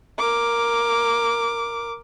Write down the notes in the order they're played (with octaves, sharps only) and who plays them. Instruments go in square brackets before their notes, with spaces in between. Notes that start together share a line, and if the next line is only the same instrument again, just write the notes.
[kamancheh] A#4 D6